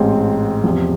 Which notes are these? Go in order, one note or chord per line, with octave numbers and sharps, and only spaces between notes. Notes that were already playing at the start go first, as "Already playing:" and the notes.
Already playing: A1 G#2 G#3 C4
E2 C3 F3